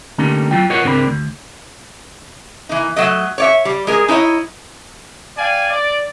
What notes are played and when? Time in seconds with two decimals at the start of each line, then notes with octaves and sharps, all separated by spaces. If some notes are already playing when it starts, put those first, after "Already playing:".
0.18 D3 G3 A3 A#3 C#4 D#4
0.51 F#3 F4 G5
0.70 F4 A#4 B4 C#5 D#5 F#5
0.84 C#2 G#2 C4 D4 A#4 B5
1.07 D2
2.69 E3 A#3 D#4
2.96 F#3 A3 D#5
3.38 C#5 D5 E5
3.65 G3
3.87 G#3 G#4 A#4
4.08 D#4 E4 C#5 D#5
5.37 D5 F5 G5 G#5
5.71 D5